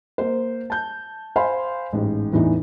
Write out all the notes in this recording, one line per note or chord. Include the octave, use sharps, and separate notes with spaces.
A#3 C5
A5 G6
C5 F5 G#5 B5 C6
A1 G#2
E2 A2 E3 D4 D#4